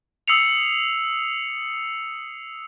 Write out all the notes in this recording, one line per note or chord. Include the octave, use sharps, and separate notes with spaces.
D#6 E6 C7 C#7 F7